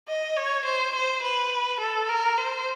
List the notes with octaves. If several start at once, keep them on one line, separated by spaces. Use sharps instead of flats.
D#5
C#5
C5
C5
B4
A4
A#4
C5